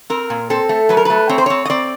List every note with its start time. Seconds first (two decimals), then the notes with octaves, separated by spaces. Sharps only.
0.10 C4 A#4
0.30 A#2
0.50 C4 A4
0.69 A3
0.89 F#3 B4
0.97 A#4
1.05 A3 B4
1.29 C4 C#5
1.38 C5
1.46 C4 C#5
1.65 D#5
1.70 C4 D5